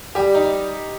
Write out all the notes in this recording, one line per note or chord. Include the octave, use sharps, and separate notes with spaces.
G3 G4
D#4